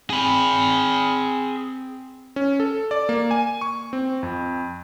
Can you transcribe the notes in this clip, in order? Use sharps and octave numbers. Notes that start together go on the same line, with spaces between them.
C4 G#4 B5
C#4
A4
D5
A#3
G#5
C#6
C4
F2